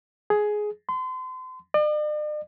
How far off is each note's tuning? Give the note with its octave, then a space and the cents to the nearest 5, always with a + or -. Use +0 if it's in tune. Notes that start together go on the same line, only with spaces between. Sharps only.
G#4 +10
C6 -35
D5 +45